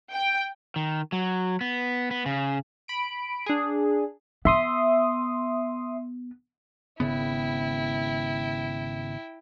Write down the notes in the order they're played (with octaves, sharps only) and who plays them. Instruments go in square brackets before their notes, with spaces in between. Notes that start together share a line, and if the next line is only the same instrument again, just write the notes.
[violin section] G5
[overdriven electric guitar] D#3
F#3
B3
B3
C#3
[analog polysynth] B5 D7
D4 G#4
[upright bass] B3 [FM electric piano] E5 C6 D#6
[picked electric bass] G#1 C#3 B3 [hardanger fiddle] E4 G5